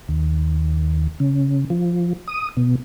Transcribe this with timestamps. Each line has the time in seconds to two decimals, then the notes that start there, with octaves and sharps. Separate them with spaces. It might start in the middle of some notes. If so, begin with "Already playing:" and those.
0.08 D#2
1.20 C#3
1.70 F3
2.28 D#6
2.57 B2